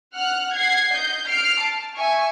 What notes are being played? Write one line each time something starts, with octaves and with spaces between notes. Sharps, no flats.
F#5 F6 F#6
F#5 G#6 C7
D#5 G6
F6 C7 D7
A5
E5 G#5 C#6